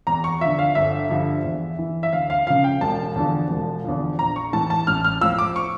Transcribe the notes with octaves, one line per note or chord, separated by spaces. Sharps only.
E2 A#5
C#6
D3 F3 E5
F5
G1 E5
G2 D3 F3
E2
E3
E5
D2 F5
F5
C#3 F3 F5
G5
E1 A5
E2 D3 F3
E1
E2 D3 F3
A#1 A#5
C#6
A2 E3 A5
A5
A1 F6
F6
A2 F3 E6
D6
C#6